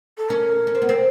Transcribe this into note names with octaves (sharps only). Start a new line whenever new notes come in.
A4
C#4 A#4
C#4
C4
B3
C4